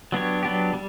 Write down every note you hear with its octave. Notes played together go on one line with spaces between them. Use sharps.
F#3 B3 D4 G4 C#5
F#3 B3 D4 G4
G3